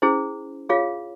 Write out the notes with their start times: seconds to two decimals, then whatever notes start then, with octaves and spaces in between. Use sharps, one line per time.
0.02 C#4 E4 G#4 C5
0.69 F4 G#4 C#5 F5